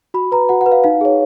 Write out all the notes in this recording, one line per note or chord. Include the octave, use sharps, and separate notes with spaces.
F#4 B5
B4 A#5
F#4 F#5
F#5
B4
F5
D#4 F5
G#4 C#5